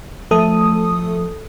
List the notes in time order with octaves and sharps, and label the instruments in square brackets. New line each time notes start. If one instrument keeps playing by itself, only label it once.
[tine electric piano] F3 [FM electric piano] A3 A4 D#6